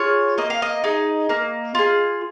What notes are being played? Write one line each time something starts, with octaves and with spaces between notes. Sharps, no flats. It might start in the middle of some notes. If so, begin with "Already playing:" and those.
Already playing: F4 G#4 C#5
A#3 D#5
F5
D#5
D#4 G#4
A#3
F4 G#4